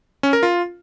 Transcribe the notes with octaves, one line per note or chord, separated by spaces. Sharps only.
C#4
A#4
F4